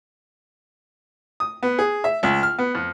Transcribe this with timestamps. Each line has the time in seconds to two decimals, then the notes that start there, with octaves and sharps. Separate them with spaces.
1.40 D#6
1.63 B3
1.79 G#4
2.04 E5
2.23 C#2
2.43 F6
2.58 B3
2.75 F2